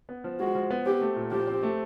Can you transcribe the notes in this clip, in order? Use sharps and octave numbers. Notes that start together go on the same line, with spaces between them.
B3
F3
G#3 F#4
F3
B3
C4 G4
A3
A#2
F3 G4
C4
A3